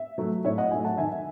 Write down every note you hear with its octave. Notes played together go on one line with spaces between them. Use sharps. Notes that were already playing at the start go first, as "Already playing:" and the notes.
Already playing: E5
F#3 A3
A2 C#5 E5
D#5 F#5
F#3 A3 E5 G#5
F#5 A5
D#3 E5 G#5